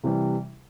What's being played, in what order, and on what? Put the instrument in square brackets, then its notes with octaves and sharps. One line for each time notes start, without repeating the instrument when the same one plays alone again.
[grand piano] C3 E3 G3